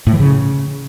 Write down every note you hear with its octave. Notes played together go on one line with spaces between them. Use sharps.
A2
E3
C#3